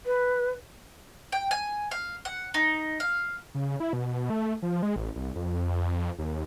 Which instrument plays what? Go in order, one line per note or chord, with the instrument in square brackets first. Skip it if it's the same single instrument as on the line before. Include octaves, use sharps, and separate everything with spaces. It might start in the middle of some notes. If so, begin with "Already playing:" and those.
[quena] B4
[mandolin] G5
G#5
F5
F#5
D#4
F5
[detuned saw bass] C#3
E4
B2
A3
F3
G#3
A1
C2
F2
D#2